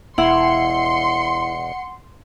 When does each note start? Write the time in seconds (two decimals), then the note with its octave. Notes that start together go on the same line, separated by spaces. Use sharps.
0.18 E1 E4 F#5 C6 C#7